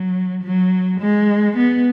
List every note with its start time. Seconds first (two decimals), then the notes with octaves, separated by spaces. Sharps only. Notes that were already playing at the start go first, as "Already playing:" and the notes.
Already playing: F#3
0.43 F#3
1.00 G#3
1.56 B3